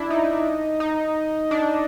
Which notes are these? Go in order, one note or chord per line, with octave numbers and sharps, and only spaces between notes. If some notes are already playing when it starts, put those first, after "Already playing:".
Already playing: D4 E4
D#4
D#4
D4